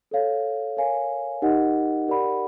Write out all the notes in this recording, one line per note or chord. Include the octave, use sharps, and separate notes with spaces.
A4 C#5 F5
A#4 C#5 F5 G#5
D#4 G4 A#4 D#5 F#5
G4 A#4 D5 F#5 B5